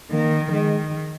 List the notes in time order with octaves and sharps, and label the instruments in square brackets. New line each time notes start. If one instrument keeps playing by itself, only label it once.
[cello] D#3 [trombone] A#3
[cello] D#3 [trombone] G#3